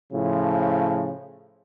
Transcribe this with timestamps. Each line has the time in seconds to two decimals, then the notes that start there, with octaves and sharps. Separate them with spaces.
0.13 A2 C#3 F3